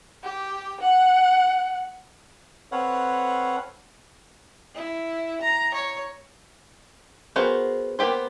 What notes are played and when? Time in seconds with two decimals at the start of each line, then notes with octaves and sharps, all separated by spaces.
0.24 G4
0.81 F#5
2.72 C4 A4 B4 C#5 F5 F#5
4.75 E4
5.41 A#5
5.74 C#5
7.36 B3 F#4 G#4 A#4 C5
7.99 A#3 B3 G4 C5